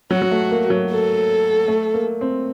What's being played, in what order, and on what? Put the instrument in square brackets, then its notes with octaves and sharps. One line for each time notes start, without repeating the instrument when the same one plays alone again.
[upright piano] F#3 [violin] F#4
[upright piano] F#3
A3
A#3
F#3
[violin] A4
[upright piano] A3
A#3
C4